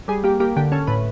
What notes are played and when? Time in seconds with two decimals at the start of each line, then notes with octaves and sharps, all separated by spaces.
0.08 G3 G#4
0.24 A#3 G4
0.40 A#3 G4
0.57 D3 G4
0.72 C#4 A4
0.87 A2 B4